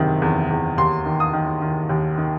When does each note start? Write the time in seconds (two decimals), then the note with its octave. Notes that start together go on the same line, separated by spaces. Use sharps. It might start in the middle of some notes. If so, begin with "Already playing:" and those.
Already playing: F#1 E2 C3 D#3
0.22 E2
0.50 E2
0.78 D#2 C6
1.05 D#3
1.20 D#6
1.33 D#3
1.62 D#3
1.89 D#2
2.18 D#3